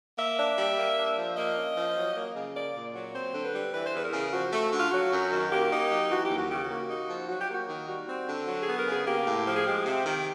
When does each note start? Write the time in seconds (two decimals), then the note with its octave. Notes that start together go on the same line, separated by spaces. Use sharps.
0.18 A#3 E5
0.39 D4
0.58 G3
0.77 A#3
0.97 D4
1.17 F3
1.37 A#3 D#5
1.57 C#4
1.77 F3
1.96 F#3
2.16 A#3
2.36 C#3
2.55 A#3 D5
2.76 A#2
2.95 F#3
3.14 C4 C5
3.34 D3
3.45 B4
3.55 G3
3.74 E3 B4
3.86 C5
3.94 E2 B4
4.04 A#4
4.13 C#3
4.33 F3 F#4
4.53 A3
4.73 D3
4.79 F4
4.92 F#3 F#4
5.12 F#2
5.32 D#3
5.52 A#3 G4
5.72 D#4
5.91 F#3
6.11 E3 F#4
6.24 G4
6.31 D#2
6.37 F#4
6.50 C#3 G4
6.64 F#4
6.70 A#3
6.89 D#4
7.10 F3
7.29 F#3 F#4
7.41 G4
7.50 A#3 F#4
7.69 D#3
7.88 G3 F#4
8.08 C4
8.28 D3
8.48 F#3
8.62 G#4
8.68 B3
8.78 A#4
8.87 C#3 G#4
9.07 A#3 G4
9.27 A2
9.47 F3
9.56 G#4
9.67 G#3 G4
9.86 C3
10.06 D#3